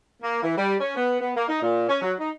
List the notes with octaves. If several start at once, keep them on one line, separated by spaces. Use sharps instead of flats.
A#3
E3
G3
C#4
B3
B3
A#3
D#4
A#2
C#4
F#3
D#4